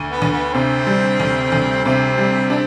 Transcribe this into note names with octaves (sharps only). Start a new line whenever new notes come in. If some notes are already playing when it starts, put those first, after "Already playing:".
Already playing: D2
B3
D2
B3
C3 C4
G3
D2
D2
C3 C4
G3
D4